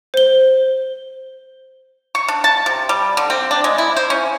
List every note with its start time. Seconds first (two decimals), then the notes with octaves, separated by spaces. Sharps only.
0.14 C5 G7
2.15 C#6
2.28 D4
2.44 A5
2.66 C3
2.89 G3
3.17 D3
3.30 C4
3.51 D4
3.64 G#3
3.78 E4
3.96 C5
4.10 C#4